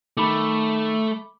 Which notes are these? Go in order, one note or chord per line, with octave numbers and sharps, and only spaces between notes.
D#3 A3 B5 D6